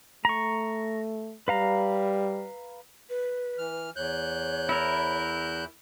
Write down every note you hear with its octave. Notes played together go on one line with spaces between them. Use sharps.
A3 A#5 C#6
G3 B4 F5 A#5
B4
E3 F6
E2 C#5 F#6 G6
E4 A#4